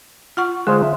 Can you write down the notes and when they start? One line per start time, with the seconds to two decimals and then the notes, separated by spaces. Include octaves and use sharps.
0.37 F4 F#5 C#6
0.67 D3 G#3 F4 C5
0.83 E5